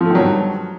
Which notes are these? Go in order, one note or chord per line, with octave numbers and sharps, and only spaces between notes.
G2 D#3 F3 F#3 A3